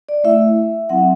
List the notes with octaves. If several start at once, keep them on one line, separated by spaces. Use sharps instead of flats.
D5
A3 E4 E5
F#3 C4 E4 F#5